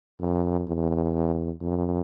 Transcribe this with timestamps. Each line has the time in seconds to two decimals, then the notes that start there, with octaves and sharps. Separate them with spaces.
0.21 F2
0.68 E2
1.62 F2